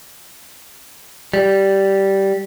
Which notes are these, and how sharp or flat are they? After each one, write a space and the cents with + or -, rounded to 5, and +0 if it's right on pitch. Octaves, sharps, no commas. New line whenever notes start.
G3 -10